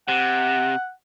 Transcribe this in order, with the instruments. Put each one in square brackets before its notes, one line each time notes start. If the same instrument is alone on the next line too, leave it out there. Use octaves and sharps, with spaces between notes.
[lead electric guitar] C3 [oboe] F#5